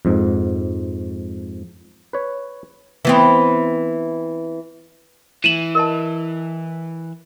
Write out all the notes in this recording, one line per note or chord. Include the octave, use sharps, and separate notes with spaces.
F2 G#2
B4 C#5
E3 B3 C4
E3 D#7 E7 F#7
A#4 D#5 A5